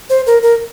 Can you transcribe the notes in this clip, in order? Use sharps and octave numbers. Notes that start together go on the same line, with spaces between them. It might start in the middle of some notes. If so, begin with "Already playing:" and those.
C5
A#4
A#4